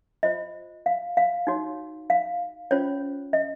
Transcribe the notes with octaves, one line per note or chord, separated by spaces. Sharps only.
F4 C5 D#5
F5
F5
D#4 F#4 C#5
F5
C#4 F4 C5 C#5
D#5